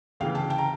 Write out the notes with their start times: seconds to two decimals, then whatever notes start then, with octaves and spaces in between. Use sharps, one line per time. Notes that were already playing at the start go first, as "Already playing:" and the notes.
0.20 D2 C#3 E3 F5 G5
0.35 G5 A5
0.50 G5 A5
0.58 A#5